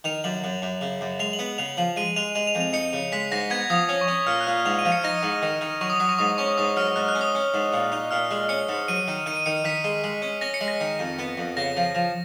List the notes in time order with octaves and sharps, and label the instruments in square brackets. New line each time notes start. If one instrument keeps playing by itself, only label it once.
[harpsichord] D#3 [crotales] F7
[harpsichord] F#2 [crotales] F#7
[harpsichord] F#2
F#2
C#3
F#2
[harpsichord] G#3 [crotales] F7
[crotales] F#7
[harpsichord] B3
[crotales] F#7
[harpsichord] C#3 [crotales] F7
[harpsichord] F3 [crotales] F#7
[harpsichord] G#3 [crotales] D#7
[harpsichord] G#3 [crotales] F7
[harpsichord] G#3 [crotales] F7
[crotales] F7
[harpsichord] F2
[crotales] F7
[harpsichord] D#4 [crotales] C#7
[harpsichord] C#3
[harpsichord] G#3 [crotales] B6
[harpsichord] G#2 [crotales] A#6
[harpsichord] B3 [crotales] G#6
[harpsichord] F3 [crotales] D#6
[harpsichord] C#4
[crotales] C#6
[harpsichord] C#4
[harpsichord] A#2 [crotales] F6
[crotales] F#6
[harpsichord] A#2
[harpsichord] G#2 [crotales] F7
[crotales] D#7
[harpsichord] F3
[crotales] C#7
[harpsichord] D#4 [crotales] A#6
[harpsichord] G#2
D#3
D#3
[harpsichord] F#3 [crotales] C#6
[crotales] D#6
[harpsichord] F#3 [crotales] D#6
[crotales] C#6
[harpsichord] G#2 [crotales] D#6
[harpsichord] C#4 [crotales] C#6
[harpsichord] G#2 [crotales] D#6
[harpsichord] F#3 [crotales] F6
[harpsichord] G#2 [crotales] F#6
[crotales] F#6
[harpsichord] C#4
[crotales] D#6
[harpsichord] C#4
G#2
A#2
D#4
[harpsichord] A#2 [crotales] F6
[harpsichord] G#3
[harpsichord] C#4 [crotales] C#7
[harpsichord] G#2
[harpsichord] F#3 [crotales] D#7
[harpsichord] D#3
[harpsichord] D#3 [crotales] D#7
[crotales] D#7
[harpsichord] D#3 [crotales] C#7
[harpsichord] D#3 [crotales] B6
[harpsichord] G#3
G#3
C#4
[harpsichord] C#4 [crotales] A#6
[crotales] C#7
[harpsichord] G#3
[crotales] A#6
[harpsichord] D#3
F2
B3
F2
[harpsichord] C#3 [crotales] A#6
[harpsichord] F3
F3